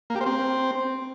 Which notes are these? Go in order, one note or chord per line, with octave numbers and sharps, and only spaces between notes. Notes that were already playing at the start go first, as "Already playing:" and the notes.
A#3
G4
C5
C4